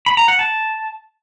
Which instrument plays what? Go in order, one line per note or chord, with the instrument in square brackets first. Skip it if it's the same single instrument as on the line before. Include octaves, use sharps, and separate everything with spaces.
[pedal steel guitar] B5
A#5
F#5
A5